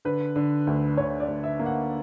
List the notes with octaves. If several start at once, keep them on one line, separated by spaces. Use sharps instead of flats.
D3 B4
D3
D2
D3 C#5
D5
D2
E5
A#3
F#5